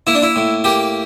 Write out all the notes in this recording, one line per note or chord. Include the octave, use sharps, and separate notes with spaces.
A#3 E4
D4
E4
A2
A#3 G4